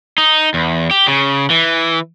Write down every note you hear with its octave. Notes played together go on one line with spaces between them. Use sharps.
D#4
E2
G4
C#3
E3